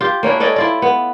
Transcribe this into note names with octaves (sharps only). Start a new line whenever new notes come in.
F4 G4
A#3 C#4 D4 E4
C#4 A4 D5 D#5
E4 F4 D5
B3